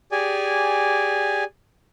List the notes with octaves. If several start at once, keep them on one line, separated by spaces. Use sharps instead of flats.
G4 G#4 D5 G#5